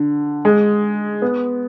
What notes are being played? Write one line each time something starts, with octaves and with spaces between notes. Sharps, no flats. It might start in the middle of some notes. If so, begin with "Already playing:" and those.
Already playing: D3
G#3
B3